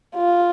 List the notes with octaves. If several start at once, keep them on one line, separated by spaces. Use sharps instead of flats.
F4